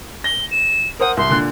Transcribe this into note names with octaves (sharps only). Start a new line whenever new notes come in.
A#6 G7
E7
A#4 C5 F#5 D#6
C2 C6
A#2 D3 F#6